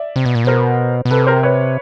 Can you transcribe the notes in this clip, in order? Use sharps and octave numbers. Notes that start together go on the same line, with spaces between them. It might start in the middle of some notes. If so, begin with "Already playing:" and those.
Already playing: D5 E5
C3
B2
A#2
B2 A#4 C5
B2
C3 A4 B4
A#4 C5
B4 C#5